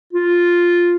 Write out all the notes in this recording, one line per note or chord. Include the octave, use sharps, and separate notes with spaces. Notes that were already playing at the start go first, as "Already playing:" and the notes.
F4